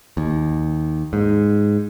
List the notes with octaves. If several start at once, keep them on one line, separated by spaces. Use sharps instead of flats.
D#2
G#2